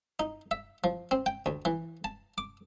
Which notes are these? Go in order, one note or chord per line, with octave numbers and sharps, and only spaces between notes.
D#4
E5
F3
C4
G5
D2
E3
A5
D6